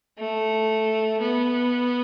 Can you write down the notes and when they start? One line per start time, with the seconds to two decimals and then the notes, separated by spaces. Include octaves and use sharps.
0.18 A3
1.21 B3